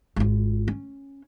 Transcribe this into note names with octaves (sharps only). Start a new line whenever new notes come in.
G#1 F4
C#4